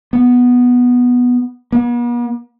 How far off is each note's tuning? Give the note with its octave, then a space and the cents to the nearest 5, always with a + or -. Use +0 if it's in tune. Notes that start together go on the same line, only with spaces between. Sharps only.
B3 -5
B3 -45